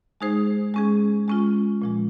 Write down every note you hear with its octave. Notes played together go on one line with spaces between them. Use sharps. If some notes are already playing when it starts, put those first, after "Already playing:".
G#3 D#4 G#4 C5
G#3 C#4 G#4
G#3 C#4 F4
A#2 F3 G#3